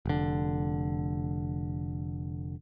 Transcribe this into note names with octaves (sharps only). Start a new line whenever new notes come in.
F1 D3